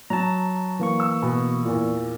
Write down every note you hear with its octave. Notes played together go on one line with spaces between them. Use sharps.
F#3 A5 A#5
E3 A#3 C#6
E6
B2
E2 A#2